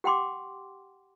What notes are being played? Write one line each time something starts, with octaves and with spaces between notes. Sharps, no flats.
G4 F#5 G5 C6 D6